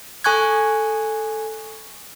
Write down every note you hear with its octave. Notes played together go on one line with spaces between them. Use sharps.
A4 G#5 C#6 F#6 G#6